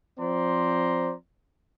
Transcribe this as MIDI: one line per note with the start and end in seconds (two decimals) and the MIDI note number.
0.19 1.13 53
0.19 1.13 60
0.19 1.13 72
0.19 1.13 74
0.19 1.13 82
0.19 1.13 84